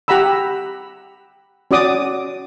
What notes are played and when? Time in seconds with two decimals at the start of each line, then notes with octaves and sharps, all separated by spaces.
0.08 G4 F#5 A#5 B5 E6
1.71 C#4 F#4 D5 D6 D#6